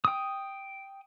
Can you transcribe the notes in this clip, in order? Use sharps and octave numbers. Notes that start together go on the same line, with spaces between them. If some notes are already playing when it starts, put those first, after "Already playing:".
G5 D#6